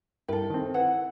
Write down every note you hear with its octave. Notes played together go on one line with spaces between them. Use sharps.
G2 E4 A4 A#4 G5
D#3 C4
E4 B4 F#5